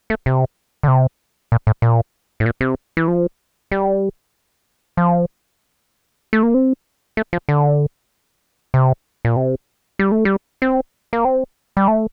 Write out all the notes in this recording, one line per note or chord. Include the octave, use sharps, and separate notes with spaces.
A3
C3
D3
C3
A#2
A2
A#2
A2
A#2
C3
E3
F3
G3
F3
A3
A#3
C4
A3
F3
D3
C3
A#2
C3
G3
A3
G3
C4
A#3
C4
G3
A3